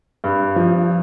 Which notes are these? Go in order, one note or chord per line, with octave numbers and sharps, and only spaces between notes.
G2
F3